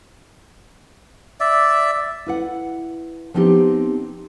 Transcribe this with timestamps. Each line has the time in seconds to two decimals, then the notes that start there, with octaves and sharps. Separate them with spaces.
1.40 D5 E5
2.26 E4 B4 F#5
3.34 F3 B3 C4 D#4 G4